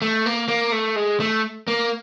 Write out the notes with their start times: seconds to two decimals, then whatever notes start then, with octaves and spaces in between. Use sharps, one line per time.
0.02 A3
0.26 A#3
0.48 A#3
0.72 A3
0.96 G#3
1.20 A3
1.68 A#3